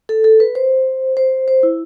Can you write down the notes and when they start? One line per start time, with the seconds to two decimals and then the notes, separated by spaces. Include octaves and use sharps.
0.09 A4
0.24 A4
0.40 B4
0.55 C5
1.17 C5
1.48 C5
1.63 E4